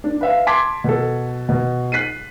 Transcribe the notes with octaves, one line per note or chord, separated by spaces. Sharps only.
D4
B4 E5 F5
A5 C6 D6 G#6 B6
B2 A4
B2
F#6 B6 C7 D#7